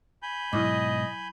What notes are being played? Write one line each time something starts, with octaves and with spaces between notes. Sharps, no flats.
G#5 B5 G6
B1 G#2 F#3 E4 D#5 D6